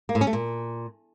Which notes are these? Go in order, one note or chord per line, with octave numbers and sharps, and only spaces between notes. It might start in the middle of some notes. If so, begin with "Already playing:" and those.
A#3
A2
C#4
A3
A#2